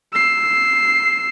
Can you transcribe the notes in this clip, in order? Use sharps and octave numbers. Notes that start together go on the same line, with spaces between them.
E6 C7